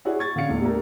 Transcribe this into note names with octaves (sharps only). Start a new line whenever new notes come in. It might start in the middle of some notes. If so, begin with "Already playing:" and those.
E4 F#4 G#4 C#5 D5 F#5
C#6 G#6 A6
D3 C#4 F5 C#7
D#1 A2
A3 D4 G4 A#4